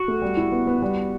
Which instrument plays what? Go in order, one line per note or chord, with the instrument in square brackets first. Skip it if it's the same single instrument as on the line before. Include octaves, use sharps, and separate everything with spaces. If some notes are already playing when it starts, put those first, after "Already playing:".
Already playing: [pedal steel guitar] F#4
[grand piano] A3
G3
E4
B3
B3
G3